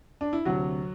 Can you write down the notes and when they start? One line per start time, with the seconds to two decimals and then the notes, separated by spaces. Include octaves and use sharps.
0.21 D4
0.33 E4
0.45 D2 C3 F#3 F#4